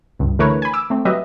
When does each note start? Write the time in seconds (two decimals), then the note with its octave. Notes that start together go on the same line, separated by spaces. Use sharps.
0.19 C#2 G2
0.39 D3 E3 A3 A#4 B4 C#5
0.62 G#5 B5
0.73 D6 E6
0.90 A3 C4
1.05 F#3 G4 B4 D#5 E5